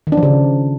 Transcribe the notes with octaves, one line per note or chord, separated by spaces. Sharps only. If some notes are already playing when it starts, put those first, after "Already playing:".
D#3
D4
F3
C#3